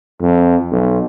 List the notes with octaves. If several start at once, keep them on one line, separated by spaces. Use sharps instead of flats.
F2
B1